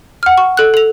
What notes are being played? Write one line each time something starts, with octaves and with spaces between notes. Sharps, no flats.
F#5 F6
C#6
A4 F#6
A4 F7